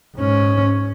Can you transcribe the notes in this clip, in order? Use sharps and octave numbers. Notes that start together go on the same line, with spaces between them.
G#2 C#4